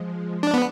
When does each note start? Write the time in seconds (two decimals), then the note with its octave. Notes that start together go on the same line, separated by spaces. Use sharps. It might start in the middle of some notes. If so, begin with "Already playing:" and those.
Already playing: F3 G#3
0.43 D4
0.54 B3